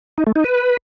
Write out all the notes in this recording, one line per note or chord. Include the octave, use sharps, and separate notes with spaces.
D#4
A3
D#4
B4